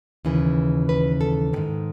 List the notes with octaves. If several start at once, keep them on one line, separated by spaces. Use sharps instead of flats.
D#2 C#3 E3
B4
A4
G#2 D#3